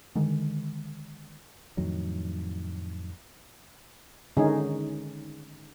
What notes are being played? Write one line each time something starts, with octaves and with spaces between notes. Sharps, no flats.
D3 D#3 G#3
F2 A2 D#3 F#3
D3 D#3 G#3 C#4 D#4 G#4